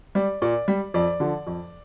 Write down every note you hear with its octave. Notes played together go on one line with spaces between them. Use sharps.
G3 D5
A#2 D5
G3
F2 D5
D3 F3
F2